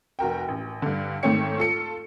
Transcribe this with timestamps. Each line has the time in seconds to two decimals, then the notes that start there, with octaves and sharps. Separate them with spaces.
0.19 F1 F#4 A#4 G5
0.48 A1
0.82 G2 D3
1.23 G#2 D#3 A3 C4 C#5 C#7
1.58 F4 A4 C#7